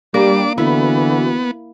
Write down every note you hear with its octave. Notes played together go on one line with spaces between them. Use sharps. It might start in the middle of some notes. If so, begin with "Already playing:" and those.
G3 A#3 D4 D6
D3 E3 B3 E4 F#4